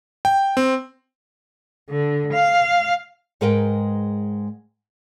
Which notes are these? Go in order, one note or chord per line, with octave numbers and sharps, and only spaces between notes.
G5
C4
D3
F5
G#2 G#3 A#4 B4 D#5 G5